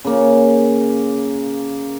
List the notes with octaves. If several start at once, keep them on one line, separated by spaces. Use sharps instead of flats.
C#3 A#3